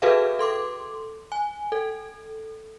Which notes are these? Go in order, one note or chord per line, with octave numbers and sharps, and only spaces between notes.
F#4 G#4 A4 B4 E5 F5
A4 C6 D6
G#5
A4